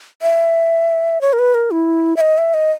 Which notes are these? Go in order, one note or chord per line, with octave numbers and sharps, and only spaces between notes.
E5
C#5
A#4
B4
A#4
E4
E5
D#5
E5
D#5